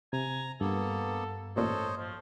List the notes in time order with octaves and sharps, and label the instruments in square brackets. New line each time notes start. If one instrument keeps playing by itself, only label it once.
[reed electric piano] C3 [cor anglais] G#5 [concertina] A#5
[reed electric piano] G2 [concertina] A#3 B3 [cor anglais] A4
[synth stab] A1 A#2 [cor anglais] A4 [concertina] C5 C#5 D#5
[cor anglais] F3